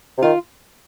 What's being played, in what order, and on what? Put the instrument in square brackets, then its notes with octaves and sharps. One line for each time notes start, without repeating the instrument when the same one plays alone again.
[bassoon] C3
[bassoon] D#3 [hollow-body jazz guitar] F4